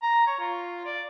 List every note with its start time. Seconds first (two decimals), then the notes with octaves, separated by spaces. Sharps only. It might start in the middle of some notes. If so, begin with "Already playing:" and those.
0.03 A#5
0.27 C#5
0.39 F4
0.85 D5